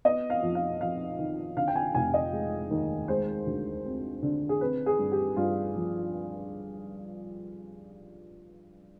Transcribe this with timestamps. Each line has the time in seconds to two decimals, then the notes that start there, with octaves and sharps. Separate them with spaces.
0.05 B3 D#5
0.30 F5
0.43 F2
0.55 F5
0.81 F2 F5
1.19 D#3
1.57 D3 F5
1.68 G5
1.76 G#5
1.95 F1 G#5
2.14 D#5
2.33 G#3
2.71 D#2
3.08 G#3 C5
3.46 D2
3.85 C4
4.22 D3
4.49 G#4
4.61 C4 B4
4.86 G#4
4.99 G2
5.12 G4
5.36 G2 F4
5.75 F3